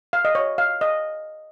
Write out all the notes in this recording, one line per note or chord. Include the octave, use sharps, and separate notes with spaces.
F5
D#5
C#5
F5
D#5